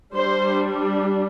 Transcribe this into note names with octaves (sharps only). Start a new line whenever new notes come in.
G3 D4 C5